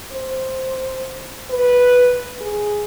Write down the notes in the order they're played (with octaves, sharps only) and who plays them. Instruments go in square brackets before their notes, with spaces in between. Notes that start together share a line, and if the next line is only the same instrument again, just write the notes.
[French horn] C5
B4
G#4